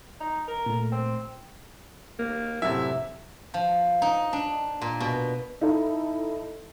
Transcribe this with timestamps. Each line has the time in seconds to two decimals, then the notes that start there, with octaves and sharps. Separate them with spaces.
0.20 D#4
0.48 A#4
0.66 A#2 A3
0.92 C4
2.19 A#3
2.62 F#2 A2 C3 E4 E5
3.54 F3
4.02 D#4
4.33 D4
4.81 A#2
5.00 B2
5.61 D#4 E4 A4